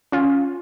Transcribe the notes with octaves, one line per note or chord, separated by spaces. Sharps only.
C#4 F4